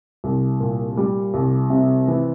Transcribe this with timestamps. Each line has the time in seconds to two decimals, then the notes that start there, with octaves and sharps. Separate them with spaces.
0.24 C2
0.60 A#2
0.97 G3
1.34 C2
1.70 C3
2.08 E3